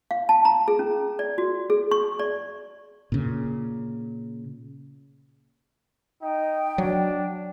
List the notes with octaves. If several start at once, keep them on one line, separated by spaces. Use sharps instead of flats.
F5
A5
A#5
G#4
C#4
D5
F#4
G#4
C#6
D5
A#2 C#3
D#4 G5
F#3 D4